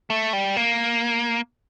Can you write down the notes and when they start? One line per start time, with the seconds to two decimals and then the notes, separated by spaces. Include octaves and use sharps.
0.10 A3
0.33 G3
0.56 A#3